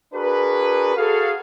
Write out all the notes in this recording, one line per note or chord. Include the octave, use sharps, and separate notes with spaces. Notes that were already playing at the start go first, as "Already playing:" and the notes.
D4 F#4 G#4 A#4 B4
F#4 G#4 A4 F5